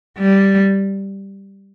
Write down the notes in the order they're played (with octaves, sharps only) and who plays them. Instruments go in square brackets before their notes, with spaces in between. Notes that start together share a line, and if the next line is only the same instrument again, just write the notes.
[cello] G3